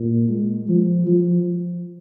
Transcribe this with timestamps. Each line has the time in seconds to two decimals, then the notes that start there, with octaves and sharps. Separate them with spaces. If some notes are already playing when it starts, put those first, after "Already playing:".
Already playing: A#2
0.29 G#3
0.68 F3
1.07 F3